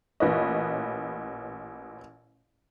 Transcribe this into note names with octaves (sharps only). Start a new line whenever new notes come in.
A1 A#2 B4 C#5 D#5